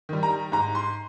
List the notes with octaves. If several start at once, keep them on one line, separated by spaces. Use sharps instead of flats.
D#3 G3
A#5
G#2 A#5
C6